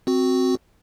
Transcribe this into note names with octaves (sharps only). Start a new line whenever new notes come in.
C4 F#4